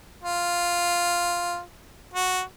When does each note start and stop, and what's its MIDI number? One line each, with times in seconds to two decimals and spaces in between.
0.23 1.60 65
2.14 2.41 66